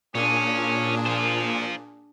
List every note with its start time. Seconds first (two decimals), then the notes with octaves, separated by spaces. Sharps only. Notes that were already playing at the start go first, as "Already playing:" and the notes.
0.15 A#2 C#4 D4 G#4
1.06 F4 C5